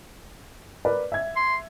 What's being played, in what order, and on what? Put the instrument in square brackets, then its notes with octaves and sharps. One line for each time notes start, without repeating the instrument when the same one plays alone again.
[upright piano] A#4 B4 D5
E5 G#6
[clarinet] C6